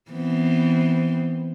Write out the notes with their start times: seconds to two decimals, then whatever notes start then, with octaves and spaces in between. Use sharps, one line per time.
0.11 E3 B3 C4